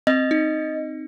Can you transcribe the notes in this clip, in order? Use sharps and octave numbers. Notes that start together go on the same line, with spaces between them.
C4 D#5
D#4